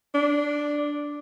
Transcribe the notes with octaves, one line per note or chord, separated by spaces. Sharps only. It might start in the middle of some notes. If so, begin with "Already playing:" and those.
D4